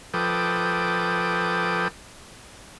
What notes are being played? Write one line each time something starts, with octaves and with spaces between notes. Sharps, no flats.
F3 A4 B4 G5 D6 D#6